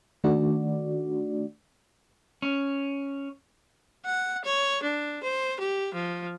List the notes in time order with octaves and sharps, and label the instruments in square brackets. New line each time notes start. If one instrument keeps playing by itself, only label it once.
[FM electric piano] D#3 A3 D4 F#4 D5
[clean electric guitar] C#4
[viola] F#5
C#5
D4
C5
G4
F3